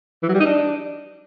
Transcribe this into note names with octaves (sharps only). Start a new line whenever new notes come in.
E3
F#3
G3
D#4
D4